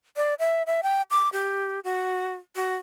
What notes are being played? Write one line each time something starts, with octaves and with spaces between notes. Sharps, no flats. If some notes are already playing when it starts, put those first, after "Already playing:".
D5
E5
E5
G5
D6
G4
F#4
F#4